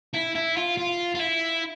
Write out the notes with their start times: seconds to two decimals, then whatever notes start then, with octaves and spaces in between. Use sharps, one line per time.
0.14 E4
0.35 E4
0.56 F4
0.77 F4
1.15 F4
1.20 E4